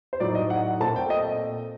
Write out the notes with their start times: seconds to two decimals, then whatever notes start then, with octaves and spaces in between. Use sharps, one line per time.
0.13 C5
0.20 A2 F#3 A3 D#4 D5
0.35 D#5
0.50 F#5
0.80 A#2 A3 C4 A5
0.96 G5
1.10 D#5